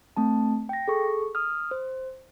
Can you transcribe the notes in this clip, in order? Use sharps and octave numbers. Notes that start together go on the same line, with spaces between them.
A3 C4 A5
G5 A#6
G#4 A4 C#6
D#6 F6
C5